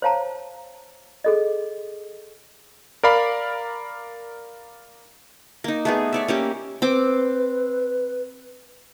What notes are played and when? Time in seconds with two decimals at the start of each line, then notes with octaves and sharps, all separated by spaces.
0.02 C5 C#5 F5 A5 A#5
1.24 G#4 A4 D#5
3.03 A#4 D5 F5 B5
5.64 A#3 D#4
5.85 A3 B3 G#4
6.13 C#5 D5 E5
6.28 A#3 C#4 G4
6.82 C4 B4 D6